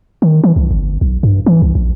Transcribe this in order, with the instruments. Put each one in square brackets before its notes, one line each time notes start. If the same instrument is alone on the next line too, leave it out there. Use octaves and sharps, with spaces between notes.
[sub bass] D#3
E3
C2
G1
B1
G2
E3
C2
A#1